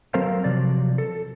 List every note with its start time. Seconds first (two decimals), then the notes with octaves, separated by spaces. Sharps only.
0.14 F#3 C4 A4 A#4 C5 F5
0.44 C3 F3 F#3 D5
0.98 A4